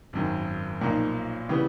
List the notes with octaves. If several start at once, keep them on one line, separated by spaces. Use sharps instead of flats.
G#1 F#2 D#3
B1 A#2 F3 A#3 D#4
C#3 E3 G3 B3